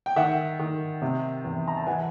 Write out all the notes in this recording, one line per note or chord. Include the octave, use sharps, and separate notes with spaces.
G5
D#3 E5 F#5
D#3
C3
E2
A#5
A5
E3 F#5 G#5